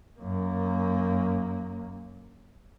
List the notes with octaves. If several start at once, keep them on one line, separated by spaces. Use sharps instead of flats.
F#2 A#3